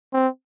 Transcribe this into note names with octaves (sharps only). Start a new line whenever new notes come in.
C4